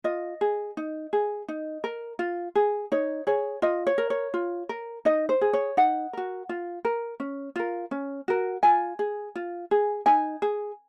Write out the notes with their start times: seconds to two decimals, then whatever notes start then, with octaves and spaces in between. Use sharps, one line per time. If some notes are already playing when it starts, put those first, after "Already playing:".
0.04 F4 D#5
0.41 G#4
0.77 D#4
1.13 G#4
1.48 D#4
1.84 A#4
2.19 F4
2.55 G#4
2.92 D#4 C#5
3.27 G#4 C#5
3.62 F4 D#5
3.87 C#5
3.98 A#4
4.10 C#5
4.34 F4
4.69 A#4
5.05 D#4 D#5
5.29 C5
5.41 G#4
5.53 C#5
5.77 D#4 F#5
6.13 F#4 A#4
6.49 F4
6.85 A#4
7.20 C#4
7.56 F4 A#4
7.91 C#4
8.28 F#4 A#4
8.63 F4 G#5
8.99 G#4
9.35 F4
9.71 G#4
10.06 D#4 G#5
10.42 G#4